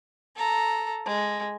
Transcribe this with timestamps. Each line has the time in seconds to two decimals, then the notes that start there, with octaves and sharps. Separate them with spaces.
0.36 A4 A#5
1.06 G#3